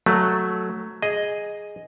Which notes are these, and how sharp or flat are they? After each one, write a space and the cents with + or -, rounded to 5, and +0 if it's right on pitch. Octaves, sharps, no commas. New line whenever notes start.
F#3 +0 A3 +0
G#4 +0 D#5 +0